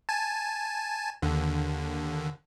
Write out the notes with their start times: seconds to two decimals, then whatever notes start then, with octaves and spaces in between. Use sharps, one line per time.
0.09 G#5 A5
1.22 D#2 D3